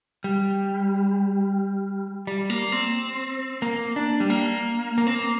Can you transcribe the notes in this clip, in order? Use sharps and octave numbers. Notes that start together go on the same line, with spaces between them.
G3
G3
A#3
C4
A#3
D4
G3
A#3
A#3
C4
A#3